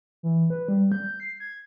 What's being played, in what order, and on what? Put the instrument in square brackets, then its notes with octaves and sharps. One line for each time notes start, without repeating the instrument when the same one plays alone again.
[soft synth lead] E3
B4
G3
G6
C7
G#6